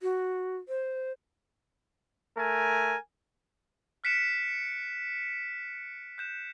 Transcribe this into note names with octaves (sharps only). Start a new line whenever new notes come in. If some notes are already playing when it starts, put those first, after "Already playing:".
F#4
C5
A3 A#4 G#5
F6 F#6 B6 C#7 D7 E7
F#6 G6 E7